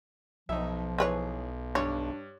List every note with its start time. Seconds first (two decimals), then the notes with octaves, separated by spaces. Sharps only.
0.49 B1 F3 D#4 E5
0.98 E3 G#4 B4 C#5
1.75 G2 D4 C#5